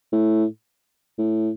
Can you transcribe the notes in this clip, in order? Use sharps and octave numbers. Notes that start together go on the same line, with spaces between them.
A2
A2